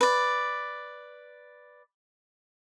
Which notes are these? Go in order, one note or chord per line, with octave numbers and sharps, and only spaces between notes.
B4 D5